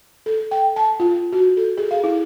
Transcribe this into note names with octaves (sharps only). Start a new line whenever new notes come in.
A4
G5
A5
F4
F#4
A4
G#4
F5
E4